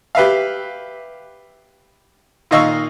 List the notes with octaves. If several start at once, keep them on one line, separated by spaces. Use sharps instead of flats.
G4 B4 E5 F5
A#2 D#3 D#5 F5 C#6 E6